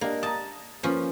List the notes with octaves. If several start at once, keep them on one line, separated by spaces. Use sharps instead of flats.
A#3 D4 G4 D#5
A5 A#5 D#6
F3 A#3 C#4 F4 B4